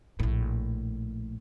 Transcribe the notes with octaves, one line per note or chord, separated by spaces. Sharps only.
A#1 A2